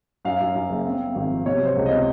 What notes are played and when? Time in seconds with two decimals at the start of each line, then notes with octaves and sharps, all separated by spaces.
0.25 F#2 F5
0.40 F#2
0.55 F#2
0.70 F#1
0.85 C4
1.00 C4
1.15 G#1
1.30 F3
1.46 C3 C#5
1.61 F#3
1.66 C5
1.76 C#2
1.86 C3 D#5